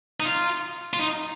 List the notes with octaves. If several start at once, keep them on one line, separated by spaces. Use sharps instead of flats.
D#4
F4
F4
D#4